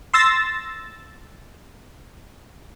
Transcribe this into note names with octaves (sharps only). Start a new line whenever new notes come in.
C6 E6 A6 A#6